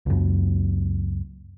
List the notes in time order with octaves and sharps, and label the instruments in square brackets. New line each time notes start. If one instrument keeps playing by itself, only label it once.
[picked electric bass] C#2 F#2